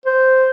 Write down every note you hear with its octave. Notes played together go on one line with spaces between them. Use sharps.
C5